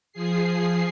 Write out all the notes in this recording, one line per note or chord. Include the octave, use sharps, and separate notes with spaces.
F3 G#4 C7